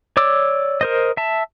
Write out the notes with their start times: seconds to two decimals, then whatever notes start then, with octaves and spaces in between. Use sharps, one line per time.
0.17 C#5 D5 D6 E6
0.81 A#4 C5 D#5
1.17 E5 A5